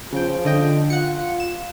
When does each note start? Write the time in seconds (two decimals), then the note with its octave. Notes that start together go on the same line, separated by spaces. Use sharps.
0.13 C#3 F3 G5
0.45 D3 D#5 G5
0.90 F4 F#5 C#7
1.40 E7